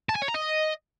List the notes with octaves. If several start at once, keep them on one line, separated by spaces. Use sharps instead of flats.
A5
G#5
C#5
A#5
D#5